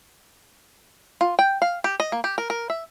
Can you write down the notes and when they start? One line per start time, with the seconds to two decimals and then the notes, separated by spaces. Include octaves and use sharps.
1.21 F4
1.39 G5
1.62 F5
1.84 G4
2.00 D#5
2.12 A#3
2.24 G4
2.38 A#4
2.50 A#4
2.70 E5